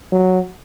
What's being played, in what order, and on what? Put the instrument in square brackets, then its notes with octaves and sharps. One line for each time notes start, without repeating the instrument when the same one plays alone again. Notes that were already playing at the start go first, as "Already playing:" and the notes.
[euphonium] F#3